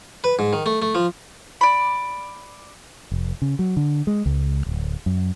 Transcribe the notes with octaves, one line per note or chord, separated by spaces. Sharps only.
B4
G#2
D#3
A3
A3
F3
D5 B5
F1
C#3
F#3
D3
G#3
C#2
D1
F#2